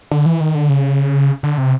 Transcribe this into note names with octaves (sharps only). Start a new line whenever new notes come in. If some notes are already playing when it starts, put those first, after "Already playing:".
D3
E3
D#3
D3
C#3
D3
C3